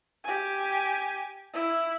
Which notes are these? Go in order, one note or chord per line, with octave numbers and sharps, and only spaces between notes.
G4 G#5
E4